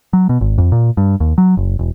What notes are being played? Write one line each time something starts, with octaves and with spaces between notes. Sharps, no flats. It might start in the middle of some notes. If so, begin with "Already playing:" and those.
F#3
B2
G#1
F2
A#2
G2
D#2
F#3
F#1
E1